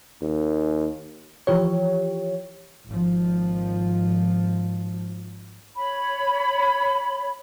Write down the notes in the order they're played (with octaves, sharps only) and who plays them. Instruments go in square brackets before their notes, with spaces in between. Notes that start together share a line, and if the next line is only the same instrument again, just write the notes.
[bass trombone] D#2
[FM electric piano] E3 F3 G4 C#5
[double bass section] G#1 F3
[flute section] C#5 B5